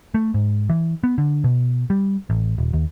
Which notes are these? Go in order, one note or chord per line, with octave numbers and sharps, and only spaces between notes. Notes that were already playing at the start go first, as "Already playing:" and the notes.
A3
G#2
E3
B3
D3
B2
G3
A1
D#1
D#2